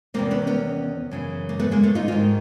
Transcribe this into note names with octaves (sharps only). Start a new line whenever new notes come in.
E2 C3 D#3 A#3 C4
B3 C#4
B3 C#4
F#2 C#3 E3
A#3
A3 B3
G#3 A#3
A3 B3
D#4 F4
G#2 D#3 D#4 F4